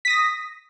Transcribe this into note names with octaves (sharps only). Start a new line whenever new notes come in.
D#6 A#6 B6